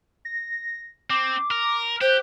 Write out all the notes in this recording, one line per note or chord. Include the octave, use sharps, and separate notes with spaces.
A#6
C4 D6
A#4
G4 C5 F#6